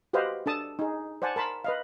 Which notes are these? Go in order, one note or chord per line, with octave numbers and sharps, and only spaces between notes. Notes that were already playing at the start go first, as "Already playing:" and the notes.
F#4 G4 B4 C5 D#5 F5
D4 A4 A5 D#6
D#4 G#4
C5 D5 F#5 G#5 A5
A#4 A5 B5 C6
B4 D#5 F5